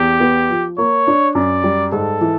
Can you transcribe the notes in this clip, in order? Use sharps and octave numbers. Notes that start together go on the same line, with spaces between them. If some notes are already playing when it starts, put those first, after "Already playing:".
Already playing: E2 G4
B3
F3
A#3 C#5
D4
F#2 D5
G3
G#2 A4
E3